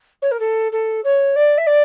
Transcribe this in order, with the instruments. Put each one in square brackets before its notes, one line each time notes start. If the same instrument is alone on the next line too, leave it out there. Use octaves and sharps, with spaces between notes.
[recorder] C#5
A#4
A4
A4
C#5
D5
E5
D5